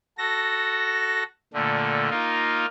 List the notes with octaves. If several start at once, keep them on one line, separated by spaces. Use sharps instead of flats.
F#4 A4 A#6
A#2 D3 A3
A#3 D#4 F4